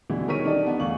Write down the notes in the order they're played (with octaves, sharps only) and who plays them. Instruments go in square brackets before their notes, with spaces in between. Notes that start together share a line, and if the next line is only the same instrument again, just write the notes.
[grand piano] B2 D3 E3 G3 G#3 E4
D#3 A#4 C#5 C#6 B6 D#7
D4 D#4 G4 A4 D5
B3 D4
E2 G3 A3 F5 C#6 F#7